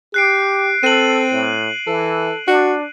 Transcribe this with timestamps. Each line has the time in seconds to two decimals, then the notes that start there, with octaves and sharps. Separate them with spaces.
0.14 G4 F#6 C7 D7
0.83 C4 A4 D#7 F#7
1.31 A2
1.87 E3 A4
2.47 D4 F#4